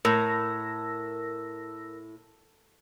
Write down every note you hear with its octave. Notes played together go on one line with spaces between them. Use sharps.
A2 A#4 E6 A#6